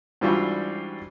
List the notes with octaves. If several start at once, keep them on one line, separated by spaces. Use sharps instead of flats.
G#2 E3 G3 D4 F4 F#4